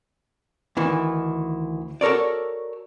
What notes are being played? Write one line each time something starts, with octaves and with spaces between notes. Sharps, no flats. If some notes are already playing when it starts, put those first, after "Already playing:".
D2 D#3 E3
F#4 A4 A#4 C#5 D5